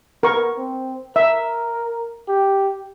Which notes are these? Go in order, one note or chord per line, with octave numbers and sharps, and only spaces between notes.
B3 A#4 C#6
C4
A#4 E5
G4